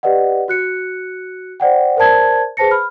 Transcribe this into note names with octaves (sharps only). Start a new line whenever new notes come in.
G4 B4 D5 D#5 F#5
F#4 F#6 C#7
C5 D5 F#5 G5
A#4 C5 D5 A5 G#6
G#4 B4 C5 A5 A#6 C#7
B5 F6